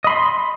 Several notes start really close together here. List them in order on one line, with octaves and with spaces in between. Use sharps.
D#5 B5 C6